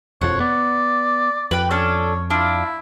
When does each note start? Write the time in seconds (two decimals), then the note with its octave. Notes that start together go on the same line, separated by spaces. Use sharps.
0.21 E1 F2 F3 C#5 F#5
0.40 B3 D5
1.51 F2 B4 G5
1.71 C#4 D4 A4 C#5
2.30 D4 E4 F4